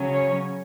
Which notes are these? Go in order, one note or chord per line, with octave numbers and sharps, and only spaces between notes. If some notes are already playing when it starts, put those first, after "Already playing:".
Already playing: C#3 F#3 C#4
C#5